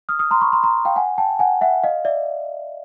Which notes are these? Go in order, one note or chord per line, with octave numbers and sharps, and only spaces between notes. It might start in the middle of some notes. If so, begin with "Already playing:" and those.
D#6 F6
D#6 F6
A#5 C6
B5 C#6
A#5 C6
A#5 C6
F5 G5
F#5 G#5
G5 A5
F#5 G#5
E5 F#5
D#5 F5
D5 E5